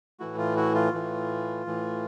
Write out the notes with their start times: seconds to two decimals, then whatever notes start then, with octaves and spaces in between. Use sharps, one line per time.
0.20 A2 E3 A3 E4 F#4
0.38 F4
0.56 E4 F#4
0.75 F4
0.94 A2 E3 A3
1.66 A2 E3 A3